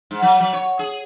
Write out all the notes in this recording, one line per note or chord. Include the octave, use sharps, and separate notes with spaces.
G#2
F#3
F#3
C#5
G#4